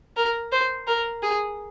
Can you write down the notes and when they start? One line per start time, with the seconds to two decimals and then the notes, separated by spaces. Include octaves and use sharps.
0.17 A#4
0.52 C5
0.87 A#4
1.23 G#4